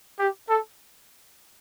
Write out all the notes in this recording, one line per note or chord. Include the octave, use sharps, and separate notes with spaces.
G4
A4